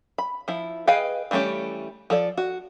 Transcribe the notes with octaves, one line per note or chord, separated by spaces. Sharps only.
B5
F3 E4
G#4 B4 D#5 F5 G5
E3 G3 A3 C#4 G4
F3 A4 D5
F#4